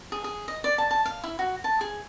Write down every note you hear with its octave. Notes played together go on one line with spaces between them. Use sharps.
G#4
G#4
D#5
D5
A5
A5
F5
E4
F#4
A5
G#4